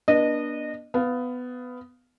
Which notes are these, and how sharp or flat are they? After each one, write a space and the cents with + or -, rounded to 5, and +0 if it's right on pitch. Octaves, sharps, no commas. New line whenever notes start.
B3 -40 D4 +0 D#5 -20
B3 +15 F5 +0